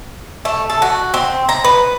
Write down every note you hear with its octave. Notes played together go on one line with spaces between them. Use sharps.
A3
A4
F#4
C4
A#5
B4